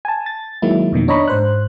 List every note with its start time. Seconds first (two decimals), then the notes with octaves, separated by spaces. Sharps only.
0.05 G#5 A5
0.26 A6
0.62 D#3 F#3 G#3 A#3 E4
0.92 F2 B2 D#3 A#3
1.08 D4 C#5 D#5 A#5 B5 C#6
1.28 G#2 C5 F#6